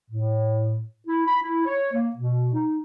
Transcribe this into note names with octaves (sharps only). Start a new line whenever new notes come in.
A2
E4
B5
E4
C#5
A#3
B2
D#4